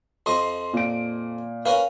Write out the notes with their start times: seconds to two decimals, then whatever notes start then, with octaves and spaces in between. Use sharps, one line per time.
0.26 F2 F3 D#5 C6
0.73 A#2 D7
1.66 C#4 A#4 B4 F5